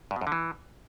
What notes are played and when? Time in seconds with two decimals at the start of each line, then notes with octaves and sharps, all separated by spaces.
0.11 G2
0.16 B2
0.21 F#2
0.27 D3
0.32 E3